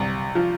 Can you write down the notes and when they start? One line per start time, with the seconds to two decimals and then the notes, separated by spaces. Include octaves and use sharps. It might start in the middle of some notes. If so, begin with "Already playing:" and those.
Already playing: C2
0.35 F3